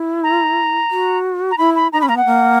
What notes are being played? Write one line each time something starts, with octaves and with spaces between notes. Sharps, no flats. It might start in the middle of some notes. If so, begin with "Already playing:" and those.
Already playing: E4
A#5
F#4
A#5
E4 B5
B5
D#4 A#5
C#4 B5
A#3 A#5
B3 F#5
A#3